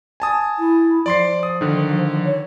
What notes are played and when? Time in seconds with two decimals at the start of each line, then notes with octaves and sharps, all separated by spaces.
0.20 G#5 A5 D#6
0.59 E4
1.06 F3 D5 C6 C7
1.43 D#6
1.61 D3 D#3
2.25 C#5